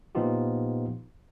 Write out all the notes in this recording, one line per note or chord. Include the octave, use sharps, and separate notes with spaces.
A#2 F3 B3 D#4 F4 G4